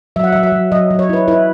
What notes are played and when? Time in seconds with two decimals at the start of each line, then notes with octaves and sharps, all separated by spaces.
0.16 F#3 E5
0.24 F#5
0.32 E5
0.35 F#3
0.43 E5
0.52 F#3
0.72 F#3 D#5
0.91 F#3
0.99 C#5
1.09 E4 B4
1.28 E4 B4